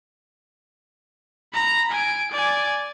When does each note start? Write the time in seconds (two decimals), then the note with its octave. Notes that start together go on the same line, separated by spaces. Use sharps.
1.53 A#5 B5
1.91 G#5 D7
2.32 D5 G#5